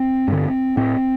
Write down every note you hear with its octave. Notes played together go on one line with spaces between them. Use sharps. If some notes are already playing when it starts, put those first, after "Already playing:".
Already playing: C4
G2 D3
A2 C4